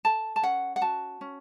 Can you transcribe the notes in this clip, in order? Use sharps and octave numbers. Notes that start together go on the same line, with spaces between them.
A4 A5
A5
C#4 F#5
F#5
F#4 A5
C#4